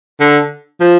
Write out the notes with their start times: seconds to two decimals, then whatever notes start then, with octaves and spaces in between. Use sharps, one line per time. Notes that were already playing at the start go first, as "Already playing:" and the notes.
0.20 D3
0.80 F3